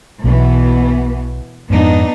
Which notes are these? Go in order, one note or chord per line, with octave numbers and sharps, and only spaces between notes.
B1 B2 E3 B3
F2 G#2 B3 D4 D#4